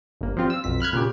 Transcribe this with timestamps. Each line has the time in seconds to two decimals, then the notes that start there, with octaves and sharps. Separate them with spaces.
0.21 G1 A#3
0.37 F3 G3 C4 F4
0.50 E6
0.64 B1 F2 B6
0.80 B5 F6 F#6 G#6
0.93 A#2 C#3 G4